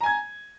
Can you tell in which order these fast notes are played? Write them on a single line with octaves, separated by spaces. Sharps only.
A#5 G#5 G#6